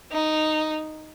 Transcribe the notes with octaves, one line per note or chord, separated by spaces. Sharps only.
D#4